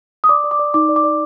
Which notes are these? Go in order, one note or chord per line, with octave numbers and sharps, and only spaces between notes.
D#6
D5 D6
D5
D6
D5
D#4 D6
D5
D6
D5